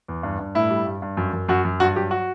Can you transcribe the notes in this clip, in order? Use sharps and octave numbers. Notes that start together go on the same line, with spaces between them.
E2
G2
G2
A2 E4
G3
G2
G2
F#2
F#2
F#2 F#4
F#2
G2 F#4
F#3 G4
F#4